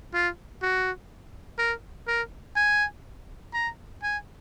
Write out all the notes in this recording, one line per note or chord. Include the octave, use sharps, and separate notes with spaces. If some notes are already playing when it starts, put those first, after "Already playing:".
F4
F#4
A#4
A#4
G#5
A#5
G#5